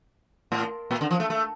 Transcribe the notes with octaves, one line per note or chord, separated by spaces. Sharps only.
A2
A#2
D3
F3
A3
A3